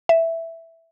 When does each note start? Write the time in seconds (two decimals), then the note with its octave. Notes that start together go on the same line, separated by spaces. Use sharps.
0.09 E5